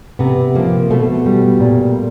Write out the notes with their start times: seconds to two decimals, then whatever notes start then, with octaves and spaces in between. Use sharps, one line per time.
0.19 C3 B3
0.54 F3 A#3
0.90 B2 A3
1.26 G3
1.60 A#2